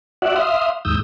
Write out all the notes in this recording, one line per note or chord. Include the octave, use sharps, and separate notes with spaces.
F#4 D5 E5 F#5
E5 F5 C6 D#6
D#2 G#2 D#6 E6 G6